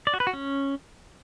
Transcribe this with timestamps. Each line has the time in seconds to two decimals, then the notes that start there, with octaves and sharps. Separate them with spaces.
0.07 D5
0.14 F#4
0.20 B4
0.27 F#4
0.33 C#4